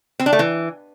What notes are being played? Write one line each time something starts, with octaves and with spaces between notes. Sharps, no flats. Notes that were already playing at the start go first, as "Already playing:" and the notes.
C4
D4
A3
E3